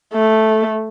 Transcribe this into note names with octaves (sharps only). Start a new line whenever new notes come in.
A3